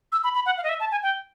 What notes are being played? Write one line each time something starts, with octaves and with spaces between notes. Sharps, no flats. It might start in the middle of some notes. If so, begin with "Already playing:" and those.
E6
B5
B5
F#5
F5
D#5
E5
A5
G#5
G5